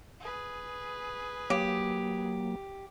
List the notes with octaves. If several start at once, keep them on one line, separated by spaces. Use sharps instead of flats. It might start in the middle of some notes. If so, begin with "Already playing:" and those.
G#4 B4
F#3 A#3 G4